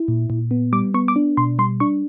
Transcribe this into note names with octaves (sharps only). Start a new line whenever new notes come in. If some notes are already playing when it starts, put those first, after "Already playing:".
Already playing: E4
A#2
A#2
B3
G3 D6
B3 C#6
D6
D4
B2 C6
G3 C6
D4 C#6